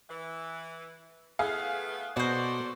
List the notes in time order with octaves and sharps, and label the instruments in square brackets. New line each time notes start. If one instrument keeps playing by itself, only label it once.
[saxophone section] E3
[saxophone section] A3 B3 [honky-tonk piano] E4 G#4 F5
[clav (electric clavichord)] B2 [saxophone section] F#3 A4 D5 [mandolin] F#4 C5